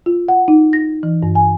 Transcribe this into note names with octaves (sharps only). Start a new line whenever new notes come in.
F4
F#5
D#4
A#6
E3
G2
G#5